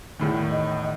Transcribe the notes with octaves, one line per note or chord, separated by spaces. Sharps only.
E2 A2 D#3
D#5